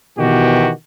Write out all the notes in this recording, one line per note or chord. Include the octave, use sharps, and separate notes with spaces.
B2 D#3 E3 F#4 G4